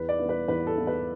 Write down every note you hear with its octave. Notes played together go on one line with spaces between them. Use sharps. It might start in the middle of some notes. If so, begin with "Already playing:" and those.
Already playing: E2 B4
D5
E3 B3 E4
B4
E2 B4
A4
E3 B3 E4
B4